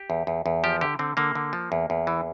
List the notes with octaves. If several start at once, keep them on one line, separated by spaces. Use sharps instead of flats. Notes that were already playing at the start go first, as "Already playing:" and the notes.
Already playing: G4
E2
E2
E2
F3 G4
D3 G4
D3 C4
D3 A#3
D3
F3
E2
E2
E3